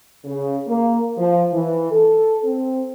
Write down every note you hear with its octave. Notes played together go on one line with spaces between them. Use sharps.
C#3
A#3
F3
E3
A4
C4